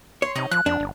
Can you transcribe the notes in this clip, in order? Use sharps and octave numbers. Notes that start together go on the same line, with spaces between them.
C#5 C6
C3 D#4 D#5
F3 F#6
F2 D4
G1